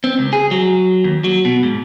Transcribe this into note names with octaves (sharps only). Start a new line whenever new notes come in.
C4
C#2
G#4
F#3
D#2
F#3
B2
G#2